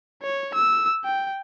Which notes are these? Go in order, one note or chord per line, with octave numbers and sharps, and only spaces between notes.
C#5
E6
G5